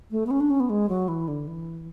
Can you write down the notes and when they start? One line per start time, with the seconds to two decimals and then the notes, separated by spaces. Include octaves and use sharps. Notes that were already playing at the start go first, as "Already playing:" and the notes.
0.11 A3
0.26 B3
0.31 C#4
0.40 D4
0.50 C#4
0.60 B3
0.70 G#3
0.89 F#3
1.08 E3
1.28 D3
1.47 E3